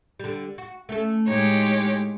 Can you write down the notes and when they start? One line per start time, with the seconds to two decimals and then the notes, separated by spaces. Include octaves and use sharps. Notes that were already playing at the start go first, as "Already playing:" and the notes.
0.20 D3 G3
0.58 F#4
0.89 A3 C#4 A4
1.27 A2 G#3 D#4 G4 C#5